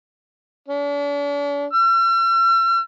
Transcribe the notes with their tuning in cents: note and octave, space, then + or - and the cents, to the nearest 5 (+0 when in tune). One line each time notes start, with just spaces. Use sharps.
D4 -45
E6 +45